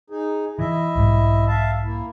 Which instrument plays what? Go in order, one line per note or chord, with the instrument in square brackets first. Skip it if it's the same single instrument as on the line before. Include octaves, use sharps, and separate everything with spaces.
[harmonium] D#4 G#4
[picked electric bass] E3 [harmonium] E4 D#5 E5
[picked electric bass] B1 G#2 G3
[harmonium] E5 F5 A5
A#3 E4